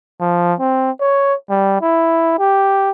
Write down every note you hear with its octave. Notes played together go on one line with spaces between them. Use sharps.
F3
C4
C#5
G3
E4
G4